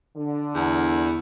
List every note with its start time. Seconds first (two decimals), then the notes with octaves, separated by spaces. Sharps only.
0.17 D3
0.55 E2